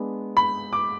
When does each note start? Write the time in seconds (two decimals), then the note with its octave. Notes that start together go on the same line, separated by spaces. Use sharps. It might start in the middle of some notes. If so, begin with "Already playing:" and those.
Already playing: G#3 B3 D4
0.37 B5
0.73 D6